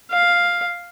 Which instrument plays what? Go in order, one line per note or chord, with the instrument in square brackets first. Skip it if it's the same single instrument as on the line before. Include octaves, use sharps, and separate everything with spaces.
[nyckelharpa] F5